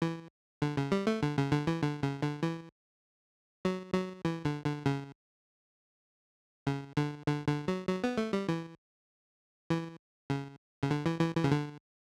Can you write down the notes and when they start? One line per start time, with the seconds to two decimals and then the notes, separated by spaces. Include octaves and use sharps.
0.02 E3
0.62 D3
0.77 C#3
0.92 G3
1.07 A3
1.23 D3
1.38 C#3
1.52 D3
1.67 E3
1.82 D3
2.03 C#3
2.22 D3
2.43 E3
3.65 F#3
3.94 F#3
4.25 E3
4.45 D3
4.65 D3
4.86 C#3
6.67 C#3
6.97 D3
7.27 D3
7.48 D3
7.68 F#3
7.87 F#3
8.04 B3
8.18 A3
8.33 G3
8.48 E3
9.70 E3
10.30 C#3
10.84 C#3
10.90 D3
11.06 E3
11.20 E3
11.35 E3
11.44 C#3
11.52 D3